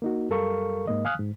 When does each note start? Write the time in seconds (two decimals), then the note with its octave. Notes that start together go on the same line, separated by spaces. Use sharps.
0.02 A#3 D#4 F#4
0.30 F#2 G3 A4 A#4 F5 C#6
0.87 G#2 A#3 D#5
1.05 F5 G#5 D#6 F6 F#6
1.19 G#2